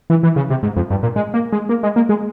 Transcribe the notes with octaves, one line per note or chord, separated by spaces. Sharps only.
E3
E3
C#3
C3
G#2
F2
G2
A#2
G#3
A#3
G#3
A#3
G#3
A#3
G#3